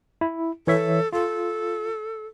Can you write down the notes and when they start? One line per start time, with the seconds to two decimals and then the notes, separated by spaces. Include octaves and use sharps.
0.21 E4
0.67 E3 A4 C#5 E5
1.13 F4 A4